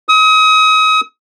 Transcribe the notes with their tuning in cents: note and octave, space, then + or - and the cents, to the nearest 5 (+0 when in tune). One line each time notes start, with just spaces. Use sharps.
D#6 +35